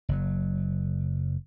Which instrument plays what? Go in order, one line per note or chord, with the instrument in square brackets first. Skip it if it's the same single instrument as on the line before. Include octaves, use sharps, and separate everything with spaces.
[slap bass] F#1 F#3